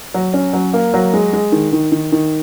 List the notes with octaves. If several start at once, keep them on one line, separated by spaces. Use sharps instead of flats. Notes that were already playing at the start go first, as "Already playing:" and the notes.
F#3
C#4
F#3
A#3
F#3
G#3
G#3
D#3
D#3
D#3
D#3